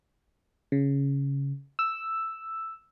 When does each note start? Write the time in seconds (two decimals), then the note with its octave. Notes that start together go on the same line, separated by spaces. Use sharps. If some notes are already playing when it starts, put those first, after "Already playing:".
0.72 C#3
1.79 E6